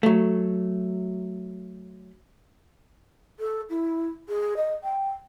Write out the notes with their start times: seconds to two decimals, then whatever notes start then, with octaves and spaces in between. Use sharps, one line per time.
0.03 F#3 A3
3.39 A4
3.70 E4
4.29 G#4
4.57 D#5
4.84 G5